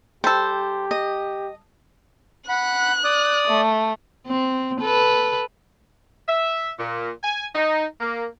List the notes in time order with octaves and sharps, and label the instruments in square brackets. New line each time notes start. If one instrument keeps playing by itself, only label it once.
[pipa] G3 A4 [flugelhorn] G4 [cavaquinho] C5
[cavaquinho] D#5
[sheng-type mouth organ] F#5 B5 [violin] F#6
[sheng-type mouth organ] D5 D#6
[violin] A3
[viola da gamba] C4
A4 B4
[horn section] E5
A#2
G#5
D#4
A#3